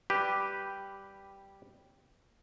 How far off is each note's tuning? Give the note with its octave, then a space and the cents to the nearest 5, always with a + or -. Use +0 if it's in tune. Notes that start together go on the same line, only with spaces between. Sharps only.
G3 +0 G4 -5 B4 +0